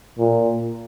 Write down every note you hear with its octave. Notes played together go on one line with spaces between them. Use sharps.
A#2